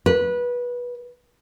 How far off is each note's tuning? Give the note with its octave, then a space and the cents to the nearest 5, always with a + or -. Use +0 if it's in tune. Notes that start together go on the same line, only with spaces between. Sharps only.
B4 -20